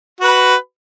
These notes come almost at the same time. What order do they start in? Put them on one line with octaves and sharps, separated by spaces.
F#4 B4 B5